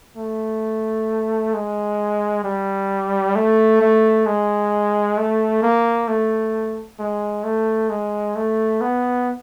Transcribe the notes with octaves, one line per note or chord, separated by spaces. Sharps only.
A3
G#3
G3
A3
A3
G#3
A3
A#3
A3
G#3
A3
G#3
A3
B3